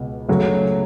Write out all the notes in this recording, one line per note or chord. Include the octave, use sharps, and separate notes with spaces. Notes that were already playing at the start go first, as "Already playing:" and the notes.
Already playing: C#2 B2
C#3 F#3 A3